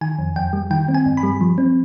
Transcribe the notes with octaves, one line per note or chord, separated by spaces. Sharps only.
D#3 G#5
F2
F2 G5
G3
D#3 G5
C4
G#5
G2
B5
G3
F3
C4